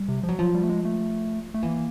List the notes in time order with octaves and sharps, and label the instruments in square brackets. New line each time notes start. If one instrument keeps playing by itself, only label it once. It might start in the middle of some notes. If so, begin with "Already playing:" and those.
Already playing: [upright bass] G3
[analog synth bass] C3
F3
[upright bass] F#3
[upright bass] F3 [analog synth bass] F#3
[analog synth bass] G3
A3
G#3
A3
A3
[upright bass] E3 [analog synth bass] A#3